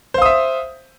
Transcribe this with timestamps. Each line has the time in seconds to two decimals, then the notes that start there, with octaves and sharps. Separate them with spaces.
0.14 C5
0.18 F5
0.22 D#6
0.25 E5